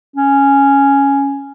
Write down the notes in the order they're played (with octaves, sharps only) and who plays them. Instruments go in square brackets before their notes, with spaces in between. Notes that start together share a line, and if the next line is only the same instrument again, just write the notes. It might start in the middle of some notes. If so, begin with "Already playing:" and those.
[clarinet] C#4